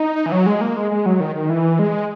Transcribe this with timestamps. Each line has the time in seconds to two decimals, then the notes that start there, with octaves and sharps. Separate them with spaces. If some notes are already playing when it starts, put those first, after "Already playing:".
Already playing: D#4
0.26 E3
0.32 F#3
0.46 G#3
0.61 A#3
0.77 G#3
0.91 G#3
1.06 F#3
1.20 D#3
1.35 D#3
1.50 E3
1.79 G#3